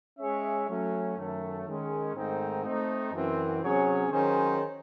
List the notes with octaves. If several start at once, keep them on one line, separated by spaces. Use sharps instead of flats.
G#3 C#4 G#4 C#5 E5
F#3 A3 C#4
F#2 D#3 F#3 A3
D#3 G#3 C#4
G#2 D#3 A3 C4 D#4
A3 C4 D#4
F#2 E3 C4
C3 F#3 C#4 G#4 C#5
D#3 F#3 C#4 G#4 C5